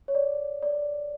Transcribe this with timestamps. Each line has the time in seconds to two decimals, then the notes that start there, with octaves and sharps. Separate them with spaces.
0.08 C#5
0.15 D5
0.62 D5